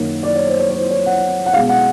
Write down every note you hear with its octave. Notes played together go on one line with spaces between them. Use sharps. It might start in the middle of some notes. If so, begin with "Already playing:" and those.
Already playing: F#2 D#3 F#3 A#3
D5
C#5
C5
C#5
C#5
C5
C#5
F#5
F#5
B2 G#3 C#4 F5
F#5